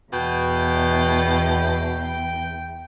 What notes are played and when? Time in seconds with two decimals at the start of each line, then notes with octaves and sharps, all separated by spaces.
0.13 E2 B2 G5